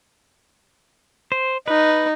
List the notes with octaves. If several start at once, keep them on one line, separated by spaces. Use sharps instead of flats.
C5
D#4 B4